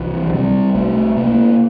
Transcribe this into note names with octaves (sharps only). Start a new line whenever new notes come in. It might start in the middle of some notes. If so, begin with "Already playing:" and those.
Already playing: C2 E3
F3
C3 G3
C2 A3
C3 A#3